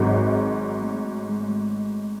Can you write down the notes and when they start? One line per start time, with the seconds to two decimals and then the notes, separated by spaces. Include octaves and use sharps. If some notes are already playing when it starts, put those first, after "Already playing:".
Already playing: G#1 G#2 F#3 G#3
0.83 A3
1.29 G#3
1.39 A3
1.49 G#3